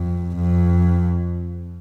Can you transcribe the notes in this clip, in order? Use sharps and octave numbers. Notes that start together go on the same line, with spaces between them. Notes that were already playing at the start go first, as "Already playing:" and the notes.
Already playing: F2
F2